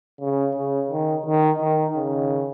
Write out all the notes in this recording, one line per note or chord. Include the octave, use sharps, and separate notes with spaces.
C#3
C#3
D#3
D#3
D#3
C#3